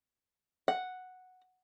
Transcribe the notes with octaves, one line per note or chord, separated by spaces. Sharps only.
F#5